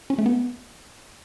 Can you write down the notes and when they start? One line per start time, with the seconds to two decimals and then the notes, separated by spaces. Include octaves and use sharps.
0.10 C#4
0.18 A3
0.26 B3